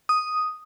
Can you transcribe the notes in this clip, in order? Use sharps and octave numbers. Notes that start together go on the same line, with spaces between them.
D#6